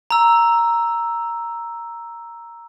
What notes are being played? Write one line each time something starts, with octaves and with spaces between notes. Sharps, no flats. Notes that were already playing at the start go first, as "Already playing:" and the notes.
A#5 E6